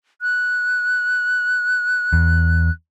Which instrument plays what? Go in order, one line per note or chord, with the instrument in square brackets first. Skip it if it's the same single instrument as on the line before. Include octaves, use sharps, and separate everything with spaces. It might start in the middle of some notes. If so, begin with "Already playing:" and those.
[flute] F#6
[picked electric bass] E2